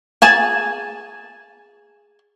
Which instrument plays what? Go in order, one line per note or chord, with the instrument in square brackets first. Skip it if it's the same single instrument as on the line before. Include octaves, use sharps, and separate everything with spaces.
[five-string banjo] G#4 G#5 A5